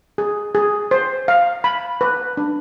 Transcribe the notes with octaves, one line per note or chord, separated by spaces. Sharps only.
G#4
G#4
C5
F5
B5
B4
D4